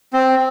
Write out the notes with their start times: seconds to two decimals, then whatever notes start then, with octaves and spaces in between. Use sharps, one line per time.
0.13 C4